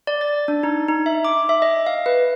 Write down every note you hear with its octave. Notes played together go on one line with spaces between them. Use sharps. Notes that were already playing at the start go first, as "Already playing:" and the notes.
D5
A6
D4
D#4
D#4
E5
D6
E5
D#5
F5
B4